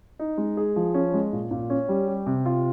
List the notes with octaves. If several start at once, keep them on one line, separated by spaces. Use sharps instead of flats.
D#4
G#3
G#4
F3
C#4
G#3
A#2
A#2
C#4
G3
G4
C3
F4